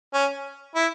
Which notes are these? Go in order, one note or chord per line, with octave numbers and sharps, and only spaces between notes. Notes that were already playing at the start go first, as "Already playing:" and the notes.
C#4
E4